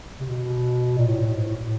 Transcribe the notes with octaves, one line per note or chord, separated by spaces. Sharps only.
C3
B2
A#2
A2
A2
G#2
A2
A2